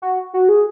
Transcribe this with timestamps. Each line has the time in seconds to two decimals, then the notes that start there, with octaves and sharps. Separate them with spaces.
0.02 F#4
0.34 F#4
0.49 G#4